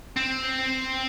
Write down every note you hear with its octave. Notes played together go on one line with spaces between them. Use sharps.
C4